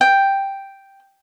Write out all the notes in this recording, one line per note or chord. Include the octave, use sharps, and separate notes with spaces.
G5